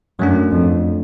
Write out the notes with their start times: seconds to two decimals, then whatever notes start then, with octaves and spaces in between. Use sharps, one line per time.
0.19 F#2 F#3 A3 D4
0.51 F2